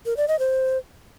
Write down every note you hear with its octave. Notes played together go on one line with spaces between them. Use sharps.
A#4
D5
D#5
C5